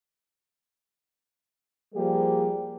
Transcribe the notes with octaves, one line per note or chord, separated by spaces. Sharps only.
F3 G3 A#3 G4 G#4